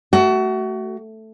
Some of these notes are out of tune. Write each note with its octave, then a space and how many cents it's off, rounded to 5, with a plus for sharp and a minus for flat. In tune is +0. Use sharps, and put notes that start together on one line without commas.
A3 +0 F#4 +25